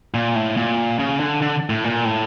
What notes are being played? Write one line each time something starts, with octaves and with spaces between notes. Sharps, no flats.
A#2
A2
A#2
C#3
D3
D3
A2
A#2
A2